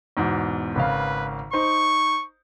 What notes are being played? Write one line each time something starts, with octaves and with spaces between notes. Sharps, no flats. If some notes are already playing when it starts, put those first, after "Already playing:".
E2 G#2 B2
G#1 C#3 B4 F5
D#4 C5 C#6